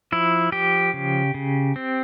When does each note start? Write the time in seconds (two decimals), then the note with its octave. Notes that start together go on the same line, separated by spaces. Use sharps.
0.12 F3 E4
0.52 F3 G4
0.94 C#3
1.34 C#3
1.76 C4